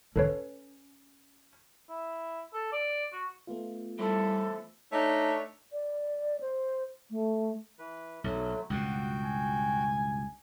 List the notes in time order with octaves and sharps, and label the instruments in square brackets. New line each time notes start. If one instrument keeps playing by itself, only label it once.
[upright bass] C#4 [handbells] A4 B4 C#5
[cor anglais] E4
A4
D5
F#4
[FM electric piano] A3 B3 F4
[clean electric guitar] E3 E4 C5 [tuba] G3 [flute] A4
[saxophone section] A3 D4 C#5 [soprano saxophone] D#4
[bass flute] D5
C5
A3
[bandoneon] E3 B4
[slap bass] B1 [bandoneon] D3 F#3 A3
[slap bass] C#2 G2 B2 [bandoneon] F#4 G5 G6 [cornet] F#5
[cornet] G#5